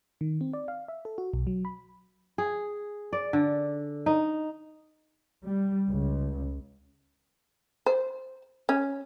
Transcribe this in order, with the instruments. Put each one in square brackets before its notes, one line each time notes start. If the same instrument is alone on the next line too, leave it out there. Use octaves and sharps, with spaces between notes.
[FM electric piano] D#3
C4
D5
F5
E5
A4
F#4
B1
F#3
B5
[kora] G#4
D5
D3
D#4
[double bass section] G3
C#2
[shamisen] C5
C#4